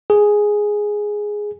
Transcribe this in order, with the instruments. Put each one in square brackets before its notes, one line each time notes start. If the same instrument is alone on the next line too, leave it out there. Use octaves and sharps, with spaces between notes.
[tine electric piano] G#4